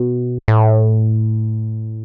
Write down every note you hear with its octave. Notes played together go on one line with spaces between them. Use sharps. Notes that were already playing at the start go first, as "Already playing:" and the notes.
Already playing: B2
A2